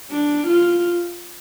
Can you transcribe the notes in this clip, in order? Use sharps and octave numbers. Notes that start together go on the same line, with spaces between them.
D4
F4